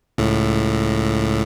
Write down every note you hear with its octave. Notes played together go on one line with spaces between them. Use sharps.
C#2 A2